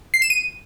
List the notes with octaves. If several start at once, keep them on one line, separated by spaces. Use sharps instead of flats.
C7
E7
D#7